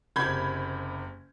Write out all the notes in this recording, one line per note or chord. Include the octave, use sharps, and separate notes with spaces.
F#1 C3 B5 G6 G#6